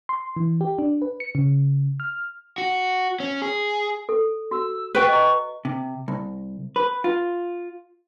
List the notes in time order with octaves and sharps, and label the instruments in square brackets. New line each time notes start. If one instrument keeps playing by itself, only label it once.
[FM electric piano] C6
E3
G4
D4
B4
C#7
C#3
F6
[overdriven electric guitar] F#4
C#4
G#4
[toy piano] A4
[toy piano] F#4 [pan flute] E6
[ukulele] B4 G5 [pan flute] C#6
[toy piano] D#5 A#5
[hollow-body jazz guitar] C3
C2
B4
F4